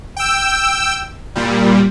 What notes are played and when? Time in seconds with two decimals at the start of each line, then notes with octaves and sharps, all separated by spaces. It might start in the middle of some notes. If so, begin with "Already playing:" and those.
0.17 G5 E6
1.35 A#2 G3